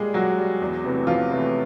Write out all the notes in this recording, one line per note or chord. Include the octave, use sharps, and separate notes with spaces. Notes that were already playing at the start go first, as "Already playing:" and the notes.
Already playing: A#2 G3 G#3 G#4
A#2 F#3 F#4
G3
E2
C3 E3 A3
E2 F3 F4
C3 E3 A3